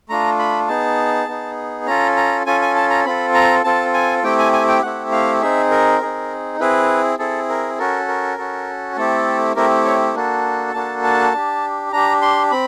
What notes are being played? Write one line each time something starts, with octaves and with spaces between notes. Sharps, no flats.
A3 D4 F4 A#5
B5
B3 D#4 G#4 A5
B3 D#4 G#4
C#4 F4 A4 A#5
A#5
C#4 F4 A4 G#5
G#5
A5
A#5
C4 F4 A4 B5
A#5
C4 F4 A4 A5
G#5
A3 C4 E4 G4 G5
G#5
G#5
G5
A3 C4 E4 G4 F#5
F5
C4 D#4 G#4 E5
A#4
C4 D#4 G#4
C4 E4 G#4 B4
C4 E4 G#4 A4
A#4
C#4 F#4 A4 A#4
A#4
C#4 F#4 A4
A3 C4 E4 G4 A4
A3 C4 E4 G4 A#4
C#5
A#3 D4 F#4 A4
A#3 D4 F#4 A4 A5
A5
D4 G4
D4 G4 A#5
C6
C4 B5